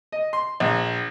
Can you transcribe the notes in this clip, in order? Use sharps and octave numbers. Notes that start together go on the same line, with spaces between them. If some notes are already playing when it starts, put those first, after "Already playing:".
D#5
C6
A#1